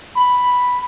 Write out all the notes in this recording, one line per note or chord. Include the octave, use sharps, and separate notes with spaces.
B5